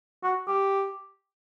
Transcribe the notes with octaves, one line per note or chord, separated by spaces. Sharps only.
F#4
G4